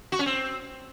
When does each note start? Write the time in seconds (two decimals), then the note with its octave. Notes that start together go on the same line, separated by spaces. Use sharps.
0.12 F#4
0.19 C#4
0.26 C4